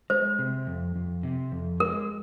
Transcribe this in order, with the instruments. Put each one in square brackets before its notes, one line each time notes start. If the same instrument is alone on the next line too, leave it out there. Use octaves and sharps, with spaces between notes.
[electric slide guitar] G#3 [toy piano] C5
[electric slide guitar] C3
F2
F2
C3
F2
[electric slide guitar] G#3 [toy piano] A#4